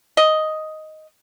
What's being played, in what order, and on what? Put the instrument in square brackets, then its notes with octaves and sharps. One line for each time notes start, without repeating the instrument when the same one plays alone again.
[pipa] D#5